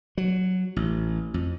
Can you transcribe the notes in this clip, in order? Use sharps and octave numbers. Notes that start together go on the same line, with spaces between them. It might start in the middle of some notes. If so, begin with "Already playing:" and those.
F#3
A1
F2